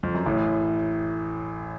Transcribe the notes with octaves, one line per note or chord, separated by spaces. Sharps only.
F2
F#2
A1 A2